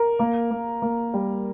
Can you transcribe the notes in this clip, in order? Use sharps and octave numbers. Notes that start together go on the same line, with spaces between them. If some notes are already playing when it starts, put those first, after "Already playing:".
Already playing: A#4
A#3
A#3
A#3
G3